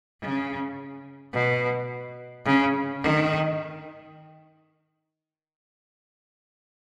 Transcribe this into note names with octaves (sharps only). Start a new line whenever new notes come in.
C#3
B2
C#3
D#3